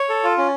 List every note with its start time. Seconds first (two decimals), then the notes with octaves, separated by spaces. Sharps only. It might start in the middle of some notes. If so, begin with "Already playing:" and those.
Already playing: C#5
0.09 A4
0.24 F4
0.38 C#4